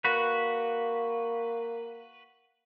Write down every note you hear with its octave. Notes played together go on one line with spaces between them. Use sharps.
A#3 F#4 B4